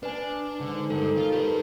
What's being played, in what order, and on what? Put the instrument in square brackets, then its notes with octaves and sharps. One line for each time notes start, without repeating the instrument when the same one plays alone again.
[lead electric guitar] D4 [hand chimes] B4 G#5
[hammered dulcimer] G#2 [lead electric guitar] D3
[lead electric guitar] G2 [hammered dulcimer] D#3 D#4 [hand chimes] A4
[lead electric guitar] F4
G4 B4